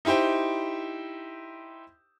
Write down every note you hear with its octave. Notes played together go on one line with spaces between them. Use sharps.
D#4 E4 G4 C5 G5